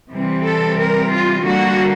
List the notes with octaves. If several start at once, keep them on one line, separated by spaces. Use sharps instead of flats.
C3 E3 G3 C4
A4
A#4
F4
D3 G3 A#3 F#4